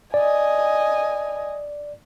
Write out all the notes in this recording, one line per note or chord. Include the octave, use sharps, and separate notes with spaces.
D5 D#5 G#5